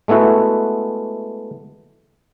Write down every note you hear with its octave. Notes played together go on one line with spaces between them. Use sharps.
G#3 A3 B3 E4 F#4